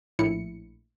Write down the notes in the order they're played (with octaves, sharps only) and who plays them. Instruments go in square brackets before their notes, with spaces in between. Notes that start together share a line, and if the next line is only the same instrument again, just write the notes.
[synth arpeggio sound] A#1 A2 E4 C#7